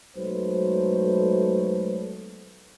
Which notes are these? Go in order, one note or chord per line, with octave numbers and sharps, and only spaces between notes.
B1 F#3 G#3 A3 B4 C5